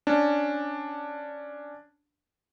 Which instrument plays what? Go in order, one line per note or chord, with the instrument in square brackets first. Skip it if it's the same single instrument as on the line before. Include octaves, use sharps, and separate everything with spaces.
[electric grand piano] C#4 D4